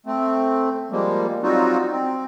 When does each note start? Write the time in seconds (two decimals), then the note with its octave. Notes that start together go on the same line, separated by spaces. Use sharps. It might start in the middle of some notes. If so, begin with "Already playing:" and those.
0.06 A3 C4
0.92 F3 G3 G#3 A#3
1.43 F#3 G3 C4 D#4 F4 F#4
1.91 C4